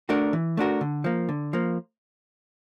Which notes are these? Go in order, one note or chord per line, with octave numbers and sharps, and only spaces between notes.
A3 D4 F#4 A#4
E3
A3 D4 F#4 A#4
D3
F3 A#3
D3
F3 A#3